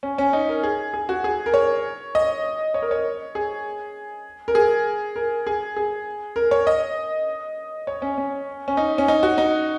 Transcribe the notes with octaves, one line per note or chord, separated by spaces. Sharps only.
C#4
C#4
D#4
A#4
G#4
G#4
F#4
G#4
A#4
C#5
D#5
C#5
A#4
C#5
G#4
A#4
G#4
A#4
G#4
G#4
A#4
C#5
D#5
C#5
C#4
C#4
C#4
D#4
C#4
D#4
F#4
D#4